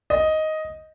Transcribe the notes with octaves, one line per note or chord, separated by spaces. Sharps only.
D#5